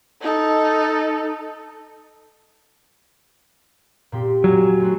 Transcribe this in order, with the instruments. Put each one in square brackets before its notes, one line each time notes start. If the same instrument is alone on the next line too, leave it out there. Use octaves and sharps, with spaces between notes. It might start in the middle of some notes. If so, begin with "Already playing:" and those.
[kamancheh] D#4 A4
[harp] A#2 C4 G4
[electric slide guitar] F#3 [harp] C#5 G#5 A#5
[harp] A3 C4 F#4